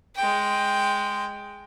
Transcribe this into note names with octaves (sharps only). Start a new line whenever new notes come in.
G#3 G5